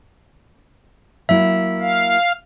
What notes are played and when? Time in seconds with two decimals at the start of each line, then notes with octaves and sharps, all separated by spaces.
1.29 F#3 A#3 E4 E5
1.81 F5